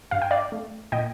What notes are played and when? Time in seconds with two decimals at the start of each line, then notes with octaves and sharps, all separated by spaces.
0.11 G2 F5
0.22 G5
0.31 D5 F5
0.52 A3
0.92 A#2 D#5 G5